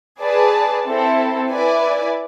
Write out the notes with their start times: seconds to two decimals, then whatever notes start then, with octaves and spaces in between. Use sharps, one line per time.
0.22 G#4 B4 D5 A5
0.88 C4 E4 A4
1.51 E4 B4 D5 G#5